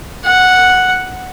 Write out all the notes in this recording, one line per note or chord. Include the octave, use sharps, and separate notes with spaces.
F#5